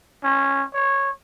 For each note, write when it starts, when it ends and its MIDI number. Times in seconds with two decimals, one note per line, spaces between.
0.24 0.64 61
0.74 1.10 73